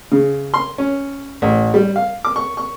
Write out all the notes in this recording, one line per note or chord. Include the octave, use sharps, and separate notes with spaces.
C#3
C6
C#4
A1
G3
F5
D6
C#6
C#6